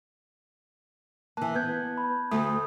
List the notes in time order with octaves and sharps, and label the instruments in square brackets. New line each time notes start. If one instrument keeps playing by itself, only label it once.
[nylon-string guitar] E3 A#3 [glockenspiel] A5 F#6
[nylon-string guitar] B3 [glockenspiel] A5 G6 G#6
[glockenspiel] B5
[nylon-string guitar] D2 A3 [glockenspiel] D#6